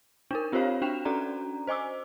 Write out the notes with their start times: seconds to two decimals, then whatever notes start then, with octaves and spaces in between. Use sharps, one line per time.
0.31 D4 D#4 A#4
0.52 C4 F4 G4 C5 C#5 F5
0.82 D4 F#4 G5 F#6 E7 F7
1.05 C#4 D4 F#4 A4 D5 A#5
1.67 C5 D#5 G#5 D6 E6